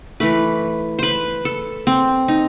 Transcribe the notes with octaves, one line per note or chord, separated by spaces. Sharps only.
E3 A3 B4
B4 C5
A4
C4
D#4